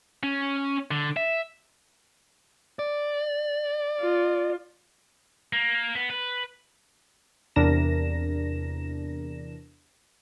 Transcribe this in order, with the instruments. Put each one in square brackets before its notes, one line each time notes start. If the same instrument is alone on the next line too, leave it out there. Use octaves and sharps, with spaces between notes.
[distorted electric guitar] C#4
D3
E5
[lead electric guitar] D5
[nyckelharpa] F4
[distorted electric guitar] A#3
B3
B4
[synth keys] E2 C3 D4 A#4 A#6 E7